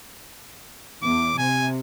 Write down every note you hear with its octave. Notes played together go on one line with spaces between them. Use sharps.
E2 D6
C3 G#5